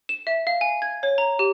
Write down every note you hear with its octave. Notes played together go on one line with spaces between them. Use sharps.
E7
E5
F5
G#5
G#6
C#5
A#5
G4